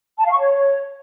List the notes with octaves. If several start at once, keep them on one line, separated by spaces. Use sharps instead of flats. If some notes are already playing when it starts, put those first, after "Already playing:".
A5
F5
C#6
C#5